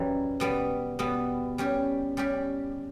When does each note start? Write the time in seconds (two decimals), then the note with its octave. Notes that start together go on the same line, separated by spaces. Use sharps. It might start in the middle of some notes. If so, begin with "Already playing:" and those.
Already playing: F#2 E3 G3
0.40 B2 G3 B3
0.99 B2 G3 B3
1.58 G3 C#4 G4
2.17 G3 C#4 G4